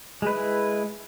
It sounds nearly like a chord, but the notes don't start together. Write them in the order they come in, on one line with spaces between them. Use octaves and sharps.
G#3 B4 E4